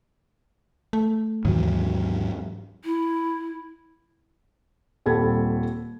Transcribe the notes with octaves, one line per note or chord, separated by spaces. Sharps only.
A3
D#2 G#2 E3 F#3
E4
D#1 G3 C4 A4 B5 G#6